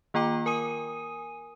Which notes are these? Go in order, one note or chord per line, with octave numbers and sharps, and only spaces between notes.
D#3 A#3 F4 G5 A#5 D6
A#4 G#5 D#6 D#7